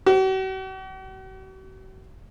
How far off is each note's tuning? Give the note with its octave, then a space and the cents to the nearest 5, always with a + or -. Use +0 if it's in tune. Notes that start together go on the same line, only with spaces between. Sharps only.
F#4 +45